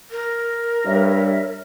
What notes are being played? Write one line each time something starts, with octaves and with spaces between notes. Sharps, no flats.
A#4
G2 C#5 E5